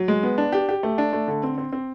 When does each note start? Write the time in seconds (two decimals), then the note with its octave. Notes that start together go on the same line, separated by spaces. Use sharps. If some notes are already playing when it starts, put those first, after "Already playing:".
Already playing: F#3
0.08 G#3
0.23 B3
0.38 D4
0.52 G4
0.69 G4
0.83 A3
0.98 D4
1.13 A3
1.28 D3
1.43 C4
1.58 C4
1.72 C4